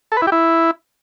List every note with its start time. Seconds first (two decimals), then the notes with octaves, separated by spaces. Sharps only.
0.12 A4
0.17 B4
0.22 E4
0.27 G4
0.32 E4